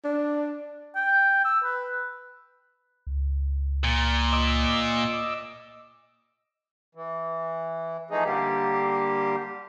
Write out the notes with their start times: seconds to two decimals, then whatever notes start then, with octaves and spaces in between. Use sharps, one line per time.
0.05 D4
0.96 G5
1.45 E6
1.64 B4
3.07 C#2
3.84 A#2
4.32 D#5 D6 E6
6.95 E3
8.11 E3 F3 A3 D#4 G#4
8.24 D3 G3 A#3 G4